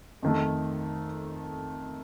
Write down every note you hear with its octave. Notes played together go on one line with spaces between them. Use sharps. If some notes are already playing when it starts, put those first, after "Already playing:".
F2 D#3 A3